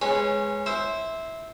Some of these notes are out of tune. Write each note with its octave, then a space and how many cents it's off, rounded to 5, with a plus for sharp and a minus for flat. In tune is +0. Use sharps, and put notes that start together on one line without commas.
G#3 +0 C#4 -20 B4 +0
E4 -15 C5 +0